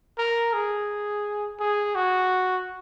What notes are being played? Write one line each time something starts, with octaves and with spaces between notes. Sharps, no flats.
A#4
G#4
G#4
F#4